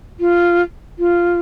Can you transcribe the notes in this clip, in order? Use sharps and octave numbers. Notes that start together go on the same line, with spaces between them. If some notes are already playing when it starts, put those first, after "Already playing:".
F4
F4